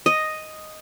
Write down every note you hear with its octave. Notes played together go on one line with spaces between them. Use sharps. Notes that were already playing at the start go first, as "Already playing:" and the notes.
D#5